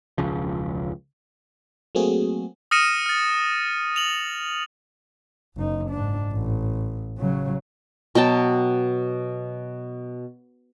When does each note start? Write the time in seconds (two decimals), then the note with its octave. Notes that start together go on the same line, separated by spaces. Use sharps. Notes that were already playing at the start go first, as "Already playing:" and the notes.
0.18 E1 C#2 C#3 F3
1.95 F#3 A3 A#3 C4 F#4 G#4
2.71 D#6 F6 A#6 C#7 D#7 E7
3.06 F6 A6
3.96 F7 F#7
5.56 F#1 D#4
5.90 G#2 D4
6.33 A1
7.18 C#3 F#3
8.15 B2 F#3 G5 A5